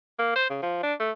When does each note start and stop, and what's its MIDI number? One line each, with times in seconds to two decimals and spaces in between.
0.19 0.34 58
0.36 0.45 72
0.50 0.60 49
0.62 0.83 53
0.83 0.94 62
1.00 1.11 57